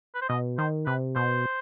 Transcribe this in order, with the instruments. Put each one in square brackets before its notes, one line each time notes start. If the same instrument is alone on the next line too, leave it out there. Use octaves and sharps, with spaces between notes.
[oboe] B4
C5
[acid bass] B2 [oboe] D#5
[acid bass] D#3 [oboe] C5
[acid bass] C3 [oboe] B4
[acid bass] B2 [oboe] C5